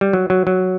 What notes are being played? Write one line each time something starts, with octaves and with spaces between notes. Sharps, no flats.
G3
F#3
F#3
F#3